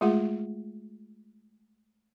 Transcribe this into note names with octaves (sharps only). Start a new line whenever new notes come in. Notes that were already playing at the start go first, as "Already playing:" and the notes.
G#3 A3 F4 G#4 F#5